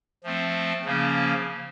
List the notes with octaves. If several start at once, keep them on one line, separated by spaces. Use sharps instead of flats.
F3 A3 C4
C#3 F3 A#3 C#4